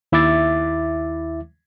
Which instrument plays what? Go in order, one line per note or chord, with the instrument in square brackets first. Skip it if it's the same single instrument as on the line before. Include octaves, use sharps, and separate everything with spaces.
[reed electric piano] D#2 E4 E5 D6 A6